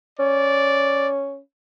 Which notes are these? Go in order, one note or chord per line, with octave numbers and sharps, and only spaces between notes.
C#4 D5